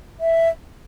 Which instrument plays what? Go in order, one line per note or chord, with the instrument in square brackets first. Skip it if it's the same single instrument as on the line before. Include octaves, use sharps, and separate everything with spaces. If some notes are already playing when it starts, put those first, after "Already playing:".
[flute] E5